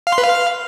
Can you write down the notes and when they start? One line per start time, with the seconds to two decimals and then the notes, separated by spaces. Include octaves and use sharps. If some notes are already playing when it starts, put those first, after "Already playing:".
0.07 F5
0.12 C6
0.18 B4
0.23 F5